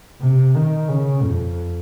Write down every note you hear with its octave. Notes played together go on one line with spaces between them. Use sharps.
C3
D#3
C#3
F2